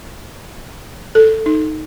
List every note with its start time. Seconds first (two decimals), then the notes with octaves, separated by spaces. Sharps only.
1.15 A4
1.46 D#4